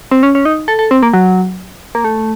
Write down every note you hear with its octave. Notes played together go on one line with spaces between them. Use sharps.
C4
C#4
C#4
D#4
A4
A4
C4
A#3
F#3
A#3
A3